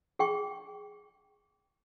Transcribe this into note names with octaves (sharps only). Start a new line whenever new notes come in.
G#4 G5 C#6